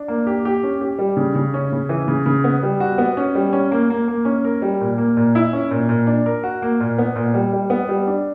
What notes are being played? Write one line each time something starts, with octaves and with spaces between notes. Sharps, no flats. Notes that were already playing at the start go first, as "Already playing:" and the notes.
Already playing: D4
A#3
G4
G4
C#4
G4
G3
C#3
C#3
C#4
C#3
E3
C#3
C#3
B3
G3
F#4
B3
C#4
G3
C#4
A#3
A#3
A#3
C#4
A#4
G3
A#2
A#3
A#2
E4
C#4
A#2
A#2
D4
A#4
F#4
A#3
A#2
B3
A#2
G3
G3
B3
G3
D4